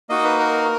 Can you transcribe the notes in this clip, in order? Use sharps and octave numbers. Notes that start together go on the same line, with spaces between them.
A#3 D#4 F#4 D#5
B4
A#4